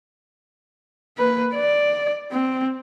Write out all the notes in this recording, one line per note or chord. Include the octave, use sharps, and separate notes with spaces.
A#3 B4
D5
C4